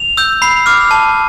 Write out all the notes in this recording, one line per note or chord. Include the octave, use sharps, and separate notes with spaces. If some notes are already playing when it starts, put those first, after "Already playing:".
Already playing: F7
E6 G6
B5 C7
D6 F6
A5